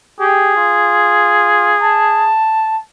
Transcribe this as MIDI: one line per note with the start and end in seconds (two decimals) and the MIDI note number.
0.20 0.54 67
0.20 2.31 68
0.56 1.76 65
1.81 2.79 81